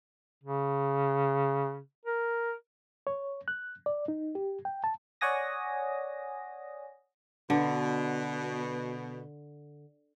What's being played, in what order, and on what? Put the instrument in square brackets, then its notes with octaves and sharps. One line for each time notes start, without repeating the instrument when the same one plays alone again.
[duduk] C#3
A#4
[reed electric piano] C#5
F#6
D5
D#4
G4
G5
A5
[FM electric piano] C#5 D5 F#5 G#5 D#6 A#6
[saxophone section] B2 [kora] D3